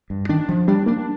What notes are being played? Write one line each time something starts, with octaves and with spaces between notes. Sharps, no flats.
G2
D#3 D4
F3
G3 D4
A#3 D4